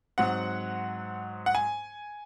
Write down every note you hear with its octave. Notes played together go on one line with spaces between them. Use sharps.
G#2 F#3 C4 F#5
F#5
G#5